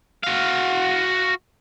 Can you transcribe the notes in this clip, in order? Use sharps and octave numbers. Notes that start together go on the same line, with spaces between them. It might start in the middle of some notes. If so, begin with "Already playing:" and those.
F#4 F5